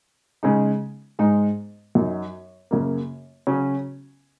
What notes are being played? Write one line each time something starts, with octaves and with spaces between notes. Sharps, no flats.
C#3 G#3 D#4
G#2 G#3 D#4
F#2 F#3 D#4
F#2 C#3 A#3
C#3 F#3 C#4